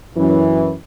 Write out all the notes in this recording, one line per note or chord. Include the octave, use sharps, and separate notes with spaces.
F#2 E3